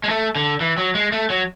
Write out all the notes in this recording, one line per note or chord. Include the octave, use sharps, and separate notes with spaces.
G#3
A3
D3
E3
F#3
G#3
A3
F#3